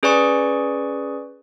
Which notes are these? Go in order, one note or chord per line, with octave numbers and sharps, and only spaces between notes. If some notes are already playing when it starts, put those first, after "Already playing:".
C#4 G#4 B4 D5 G#5 C#6